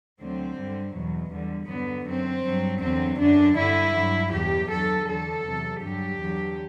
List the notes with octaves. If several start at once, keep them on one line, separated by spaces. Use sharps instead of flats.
D2 D3 F#3 C4
G2 D3 G3
E2 B2 F#3
E2 D3 G3
G2 D3 F#3 B3
F#2 F#3 C4
G2 F#3
E2 D3 F#3 C4
F#2 D3 F#3 D4
G2 D3 G3 E4
G2 F#3
E2 B2 F#3 G4
E2 D3 F#3 A4
E2 D3 F#3 A4
E2 C3 F#3
G2 D3 F#3 G4
E2 D3 F#3